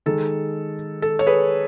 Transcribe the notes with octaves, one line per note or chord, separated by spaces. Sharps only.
D#3 G#3 A4
A4
C#5
G#4 B4